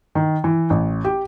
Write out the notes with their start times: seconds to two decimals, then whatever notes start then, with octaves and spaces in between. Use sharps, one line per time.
0.15 D#3
0.44 E3
0.70 A1
1.04 G4